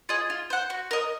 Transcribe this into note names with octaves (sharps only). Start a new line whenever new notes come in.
F4 G#4 D#5
F4
C5 F#5
F#4
A#4 D#5